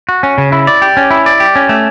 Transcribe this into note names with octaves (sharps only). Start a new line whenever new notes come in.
F#4
C#4
C#3
E4
D5
G4
C#4
E4
D5
G4
C#4
A3